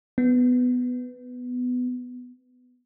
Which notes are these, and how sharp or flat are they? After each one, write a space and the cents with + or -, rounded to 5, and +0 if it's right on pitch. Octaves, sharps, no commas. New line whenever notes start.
B3 +10